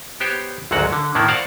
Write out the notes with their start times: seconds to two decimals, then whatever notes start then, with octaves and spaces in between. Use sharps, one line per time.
0.20 B3 G4 C5 C#5
0.71 G#1 D2 G#2 F#3 F#4 F#5
0.93 D3
1.15 A2 D#3 A#3 B3 E4
1.28 F#4 C5 D5 F5 F#5